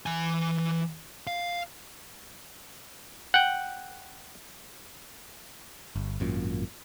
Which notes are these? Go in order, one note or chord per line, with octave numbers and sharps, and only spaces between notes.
E3 G#5
F5
F#5 G5
G1
G#1 F#2 A#2